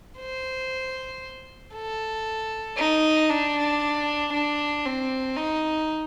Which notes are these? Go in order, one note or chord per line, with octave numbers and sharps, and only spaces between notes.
C5
A4
D#4
D4
D4
C4
D#4